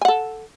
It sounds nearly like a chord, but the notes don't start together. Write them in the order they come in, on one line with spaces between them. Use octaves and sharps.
G#5 F#5 A4